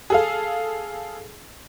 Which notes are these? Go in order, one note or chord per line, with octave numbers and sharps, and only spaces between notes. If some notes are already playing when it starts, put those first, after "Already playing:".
G#4 A4 F5